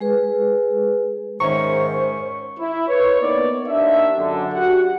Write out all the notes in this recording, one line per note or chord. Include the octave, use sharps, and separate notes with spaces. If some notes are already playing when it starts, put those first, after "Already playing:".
G#3 G#4 B4
G#2 D#3 C#4 C5 E5 A#5 C#6
E4
B4 C#5
A#3 B3 D#4 D5
D#2 D4 E5
F#2 D3
F#4 G4 F#5